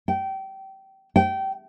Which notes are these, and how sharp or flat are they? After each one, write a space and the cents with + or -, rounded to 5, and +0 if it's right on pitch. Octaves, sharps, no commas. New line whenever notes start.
G5 -25
G5 -25